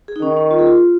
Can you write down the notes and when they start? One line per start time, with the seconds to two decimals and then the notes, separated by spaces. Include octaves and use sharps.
0.08 G#4
0.16 D#4
0.21 D#3 C#4
0.37 C#4
0.51 F4
0.59 G#4
0.67 F4